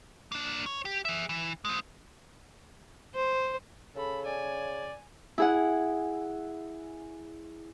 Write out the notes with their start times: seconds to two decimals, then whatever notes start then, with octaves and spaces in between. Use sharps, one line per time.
0.32 A#3 D4
0.66 C#5
0.85 G4
1.05 G#4 E5
1.29 E3
1.65 G#3 C4
3.15 C5
3.96 C#3 A4 B5
4.26 D5 G#5
5.38 E4 G#4 F#5